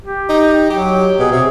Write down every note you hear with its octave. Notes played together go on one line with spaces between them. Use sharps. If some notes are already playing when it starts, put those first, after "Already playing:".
G4
D#4
F#3 G4
B2 G#4
C3